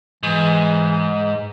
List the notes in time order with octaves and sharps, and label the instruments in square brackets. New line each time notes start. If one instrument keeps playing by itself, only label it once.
[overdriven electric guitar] G#2 [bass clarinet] E3